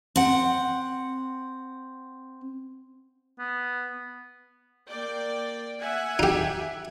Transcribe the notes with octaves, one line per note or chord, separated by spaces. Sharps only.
C4 F#5
B3
A#3 D5 G5
E5 F#5 G#5
D#4 G4